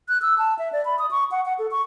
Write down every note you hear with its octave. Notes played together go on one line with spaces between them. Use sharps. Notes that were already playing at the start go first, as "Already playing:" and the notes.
F#6
E6
A5
E5
D5
B5
D#6
C#6
F#5
F#5
A4
C#6